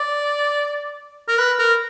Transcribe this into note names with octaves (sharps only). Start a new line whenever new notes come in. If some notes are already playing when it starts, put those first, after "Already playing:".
Already playing: D5
A#4
B4
A#4